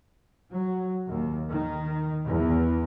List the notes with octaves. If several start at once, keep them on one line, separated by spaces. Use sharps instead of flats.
F#3
D#2
D#3
E2